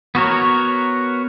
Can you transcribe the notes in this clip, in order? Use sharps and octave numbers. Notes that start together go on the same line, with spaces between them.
B3 F#4 A#4 C#5